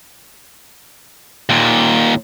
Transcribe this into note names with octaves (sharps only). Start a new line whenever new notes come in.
D#2 A#2